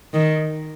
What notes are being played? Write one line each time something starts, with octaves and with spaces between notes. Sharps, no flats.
D#3